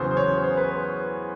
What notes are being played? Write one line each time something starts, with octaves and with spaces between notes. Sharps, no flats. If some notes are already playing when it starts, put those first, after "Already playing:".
Already playing: E2 C#3 F#3 B3 C5
C5
C#5
C5
B4